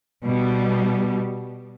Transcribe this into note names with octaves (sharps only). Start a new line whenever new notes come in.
B2 G3